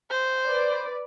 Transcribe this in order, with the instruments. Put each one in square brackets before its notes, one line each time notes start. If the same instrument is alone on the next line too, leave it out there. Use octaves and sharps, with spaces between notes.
[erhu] C5
[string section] B4 D5